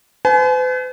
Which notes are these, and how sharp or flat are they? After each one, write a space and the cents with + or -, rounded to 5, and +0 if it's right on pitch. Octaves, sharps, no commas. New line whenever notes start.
B4 +45 G#5 +40